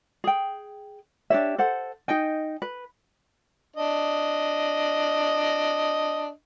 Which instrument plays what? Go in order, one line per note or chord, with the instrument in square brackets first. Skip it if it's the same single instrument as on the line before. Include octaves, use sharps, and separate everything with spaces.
[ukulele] G#4 G5
D4 G4 C#5 E5
A4 C5 F#5
D#4 D#5 G5 G#5
B4
[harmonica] D4 D#5